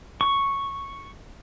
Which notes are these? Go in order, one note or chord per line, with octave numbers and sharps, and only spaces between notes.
C#6